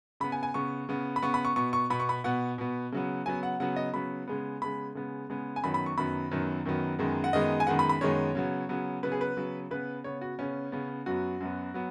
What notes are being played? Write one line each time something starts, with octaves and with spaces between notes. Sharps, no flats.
C#3 B3 B5
G#5
G#5
C#3 B3 C#6
C#3 B3
B5
C#3 B3 C#6
B5
C#6
B2 B3 C#6
C#6
B2 B3 B5
C#6
B5
B2 B3 F#5
B2 B3
C#3 F#3 B3
C#3 F#3 B3 G#5
F#5
C#3 F#3 B3 F#5
D#5
C#3 F#3 B3 B5
C#3 G#3 B3
C#3 G#3 B3 B5
C#3 G#3 B3
C#3 G#3 B3
G#5
F#2 D#3 F#3 B3 B5
B5
C#6
F#2 D#3 F#3 B3 B5
F#2 D#3 F#3 B3
F#2 D#3 F#3 B3
F#2 D#3 G#3 B3
F#5
F#2 D#3 G#3 B3 D#5
G#5
F#2 D#3 G#3 B3 F#5
B5
B5
F#2 D#3 G#3 B3 C#5
C#3 F#3 B3
C#3 F#3 B3
C#3 F#3 B3 B4
G#4
B4
C#3 F#3 B3
C#3 B3 B4
C#3 B3 C#5
F#4
C#3 B3 C#4
C#3 B3
F#2 F#3 B3 F#4
F#2 F#3 B3
F#3 B3